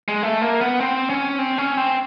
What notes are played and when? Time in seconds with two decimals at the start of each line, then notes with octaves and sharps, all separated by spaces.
0.08 G#3
0.23 A3
0.42 A#3
0.61 B3
0.80 C4
1.10 C#4
1.39 C4
1.58 C#4
1.77 C4